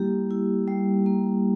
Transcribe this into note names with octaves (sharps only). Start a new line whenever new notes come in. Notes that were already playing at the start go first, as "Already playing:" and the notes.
Already playing: G3 A#3 E4 G4
E4
G3
A#3